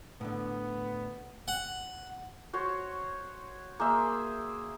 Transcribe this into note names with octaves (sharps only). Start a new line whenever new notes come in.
A2 D3 B3
F#5
F#4 C5 C#5
A#3 G#4 C5 E5